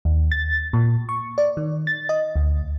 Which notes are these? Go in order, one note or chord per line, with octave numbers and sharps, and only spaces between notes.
D#2
A6
A#2
C#6
D5
D#3
A6
D#5
D2